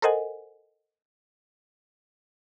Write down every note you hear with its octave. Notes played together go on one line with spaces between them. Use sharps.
A4 A#4 C5 D#5 F#5 G#5